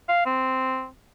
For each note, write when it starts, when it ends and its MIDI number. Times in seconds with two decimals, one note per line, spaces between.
0.09 0.24 77
0.26 0.87 60